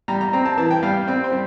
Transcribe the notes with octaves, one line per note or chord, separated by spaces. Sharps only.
G3 A#5
A#5
C4 A#5
A5
E3 A5
G5
G3 F5
C4 C5
C5
G3